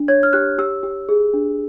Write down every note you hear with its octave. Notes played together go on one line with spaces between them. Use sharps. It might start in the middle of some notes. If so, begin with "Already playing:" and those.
Already playing: D4
C#5 G#6
F6
G4 F#6
G4 E6
G4
G#4
D4